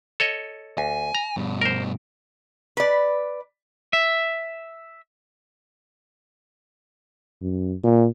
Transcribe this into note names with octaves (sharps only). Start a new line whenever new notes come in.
A4 C#5 D#5
D2 G#5
A#5
G2 B2
A#4 C5
B4 D5
E5
F#2
A#2